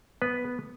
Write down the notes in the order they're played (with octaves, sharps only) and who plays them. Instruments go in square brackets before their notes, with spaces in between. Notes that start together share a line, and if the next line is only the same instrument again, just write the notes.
[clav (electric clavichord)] B3 B4